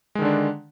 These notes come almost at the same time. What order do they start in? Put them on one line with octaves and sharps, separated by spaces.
G#3 D#3 D3 D4